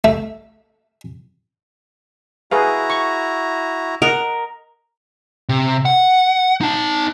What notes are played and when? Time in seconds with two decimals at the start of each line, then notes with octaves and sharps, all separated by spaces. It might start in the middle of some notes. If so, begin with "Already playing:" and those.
0.04 A3
2.51 E4 F#4 G#4 B4 F5 A#5
2.90 C#6
4.02 A#4 D#5 F#5
5.49 C3
5.85 F#5
6.61 D#4 A5